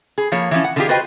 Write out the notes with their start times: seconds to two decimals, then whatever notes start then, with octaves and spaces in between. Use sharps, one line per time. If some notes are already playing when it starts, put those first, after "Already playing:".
0.18 G#4
0.32 F3 A#3 C#5
0.51 E3 F3 C#4
0.64 F#5
0.76 D3 D#3 D4 F4 G4 G#4
0.89 F4 F#4 B4 C5 D#5 G5